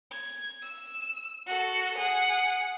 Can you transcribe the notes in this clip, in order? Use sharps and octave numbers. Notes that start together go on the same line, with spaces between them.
G#6
E6
F#4 A4
G#4 F#5